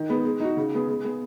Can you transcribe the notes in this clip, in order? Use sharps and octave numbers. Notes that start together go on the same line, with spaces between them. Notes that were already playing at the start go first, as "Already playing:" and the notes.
Already playing: D#3
G#3 B3
G#3
D#4 F#4
C#3
G#3 B3 G#4
G#3
B3 G#4